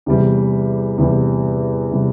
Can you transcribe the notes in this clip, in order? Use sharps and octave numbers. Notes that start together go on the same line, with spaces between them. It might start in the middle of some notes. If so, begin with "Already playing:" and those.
E2 C3 G3
E2 C3 G3
C3 G3